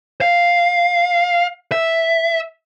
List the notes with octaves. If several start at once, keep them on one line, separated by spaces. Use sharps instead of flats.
F5
E5